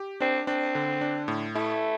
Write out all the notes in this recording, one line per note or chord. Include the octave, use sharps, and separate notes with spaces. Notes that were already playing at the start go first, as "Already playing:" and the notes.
Already playing: G4
C4 D4
C4 D4
D3
D4
A2
A3 E4